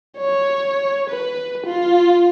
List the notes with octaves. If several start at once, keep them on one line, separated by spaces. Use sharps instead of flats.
C#5
B4
F4